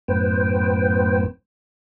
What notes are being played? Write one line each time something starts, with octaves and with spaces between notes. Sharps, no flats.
F#2 A2 B3 B4 C5 G5